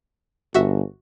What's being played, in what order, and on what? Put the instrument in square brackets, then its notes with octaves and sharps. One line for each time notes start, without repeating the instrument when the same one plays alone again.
[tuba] G1 [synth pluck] F#4 E5